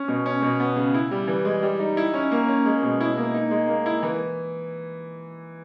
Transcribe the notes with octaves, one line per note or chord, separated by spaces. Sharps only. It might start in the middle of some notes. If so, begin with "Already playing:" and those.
Already playing: C#4
B2
C#4
B2
B3
C#3
E4
G3
E3
G#3
G3
D#4
E4
C#4
A#3
C#4
G#3
B2
E4
A#3
D#4
G#3
A#3
E4
E3